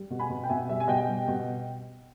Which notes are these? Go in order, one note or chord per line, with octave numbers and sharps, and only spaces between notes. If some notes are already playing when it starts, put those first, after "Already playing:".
Already playing: G3
B2
G#5 B5
B2
G5
B2 E5 G#5
G3 E5
G#5
B2 D#5 G5
G3
B2